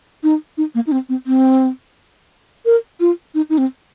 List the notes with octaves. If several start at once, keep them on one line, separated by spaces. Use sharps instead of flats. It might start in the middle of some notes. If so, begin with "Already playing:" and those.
D#4
D#4
A#3
D#4
C4
C4
C4
A#4
F4
D#4
D#4
C4